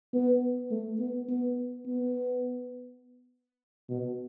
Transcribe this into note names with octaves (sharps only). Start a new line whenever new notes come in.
B3
A3
B3
B3
B3
B2